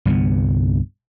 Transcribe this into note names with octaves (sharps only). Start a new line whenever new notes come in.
C2 G2 D3 B3